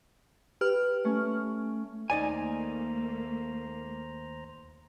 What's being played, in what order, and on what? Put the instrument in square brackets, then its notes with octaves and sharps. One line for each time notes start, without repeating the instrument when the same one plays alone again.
[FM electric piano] G4 B4 F6
[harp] A3 C#4
[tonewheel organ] D#2 C5 A#5 [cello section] A3 A#3 [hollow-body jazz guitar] D#4 D5 G#5